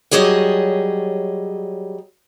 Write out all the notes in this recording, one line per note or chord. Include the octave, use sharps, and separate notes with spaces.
F#3 G3 G#4 C#5 D#5